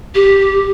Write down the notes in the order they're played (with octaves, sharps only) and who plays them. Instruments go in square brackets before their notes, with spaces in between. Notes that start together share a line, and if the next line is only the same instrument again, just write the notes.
[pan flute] G4